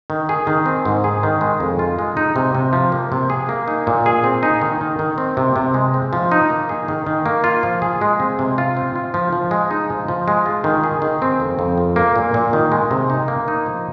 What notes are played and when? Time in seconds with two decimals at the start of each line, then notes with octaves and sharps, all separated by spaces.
0.10 D#3
0.29 G#4
0.47 D#3
0.66 C4
0.85 G#2
1.04 G#4
1.23 D#3
1.41 G#3
1.60 F2
1.79 F4
1.99 G#3
2.17 D#4
2.36 C3
2.55 C3
2.73 F3
2.92 A#3
3.12 C3
3.30 G#4
3.49 A#3
3.68 D#4
3.87 A#2
4.06 G#4
4.24 C4
4.43 D#4
4.62 D#3
4.81 D#3
4.99 D#3
5.18 C4
5.37 C3
5.56 C3
5.74 G#3
5.94 C4
6.13 F3
6.32 D#4
6.50 A#3
6.69 G#4
6.88 D#3
7.07 D#3
7.26 A#3
7.44 F4
7.63 F3
7.82 G#4
8.01 G#3
8.20 C4
8.39 C3
8.58 F4
8.77 C4
8.96 F4
9.14 F3
9.33 F3
9.51 G#3
9.71 D#4
9.90 F3
10.08 F3
10.28 G#3
10.46 F4
10.64 D#3
10.84 G#4
11.02 D#3
11.22 C4
11.40 F2
11.59 F2
11.78 F3
11.96 A#3
12.16 A#2
12.34 A#2
12.53 D#3
12.72 G#3
12.91 C3
13.10 D#4
13.28 A#3
13.48 D#4
13.66 F3